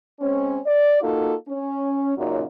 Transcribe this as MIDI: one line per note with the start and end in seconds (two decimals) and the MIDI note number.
0.20 0.58 56
0.20 0.58 60
0.20 0.58 61
0.65 1.00 74
1.01 1.34 58
1.01 1.34 63
1.01 1.34 65
1.01 1.34 66
1.01 1.34 69
1.48 2.17 61
2.17 2.43 42
2.17 2.43 46
2.17 2.43 49
2.17 2.43 54
2.17 2.43 63